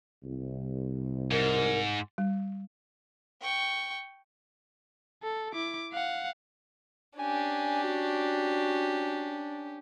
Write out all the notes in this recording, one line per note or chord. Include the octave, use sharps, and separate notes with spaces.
C2
G#2 A#4
G3
G5 C#6
A4
E4 D6
F5 F#5
C#4 D4 G4 G#5
F#4